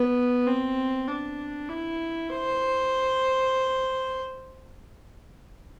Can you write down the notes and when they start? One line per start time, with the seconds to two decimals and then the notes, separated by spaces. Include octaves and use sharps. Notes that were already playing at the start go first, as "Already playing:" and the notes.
Already playing: B3
0.47 C4
1.07 D4
1.69 E4
2.30 C5